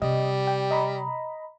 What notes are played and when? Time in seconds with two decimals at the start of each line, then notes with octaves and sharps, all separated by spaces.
0.02 C3 G3 D#5
0.47 G5
0.71 D#5 A#5 B5